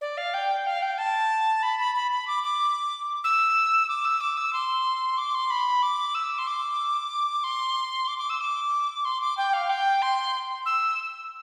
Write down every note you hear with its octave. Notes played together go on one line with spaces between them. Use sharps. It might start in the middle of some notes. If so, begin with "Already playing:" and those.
D5
F5
G5
F5
G5
A5
B5
B5
B5
B5
D6
D6
E6
D6
E6
D6
E6
C6
D6
C6
B5
D6
E6
C6
D6
C6
D6
D6
E6
D6
C6
D6
G5
F5
G5
C6
E6